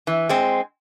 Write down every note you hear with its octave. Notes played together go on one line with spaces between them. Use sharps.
E3
G#3 C4